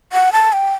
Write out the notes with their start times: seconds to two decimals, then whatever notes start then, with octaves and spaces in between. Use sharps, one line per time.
0.13 F#5
0.33 A5
0.53 G5